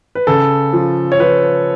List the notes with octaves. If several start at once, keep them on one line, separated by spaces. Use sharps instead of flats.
B4
C#3 A4
F3
C#5
F3 B4